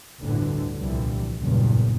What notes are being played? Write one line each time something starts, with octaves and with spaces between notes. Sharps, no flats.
G1 D2 A2 D3 E3
C2 A#2 D3 E3 F3 G3
F#1 E2 G2 A#2 C#3 G3